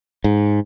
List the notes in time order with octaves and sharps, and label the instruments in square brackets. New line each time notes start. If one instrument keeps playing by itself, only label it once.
[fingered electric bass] G#2